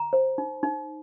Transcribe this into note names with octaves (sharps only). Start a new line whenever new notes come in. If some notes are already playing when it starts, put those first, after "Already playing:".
Already playing: A#5
C5
D#4
D#4